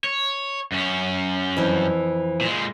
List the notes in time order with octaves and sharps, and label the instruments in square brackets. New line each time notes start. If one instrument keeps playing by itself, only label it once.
[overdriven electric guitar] C#5
F#2 C#4
[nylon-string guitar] F2 E3
[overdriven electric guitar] A#2 G#3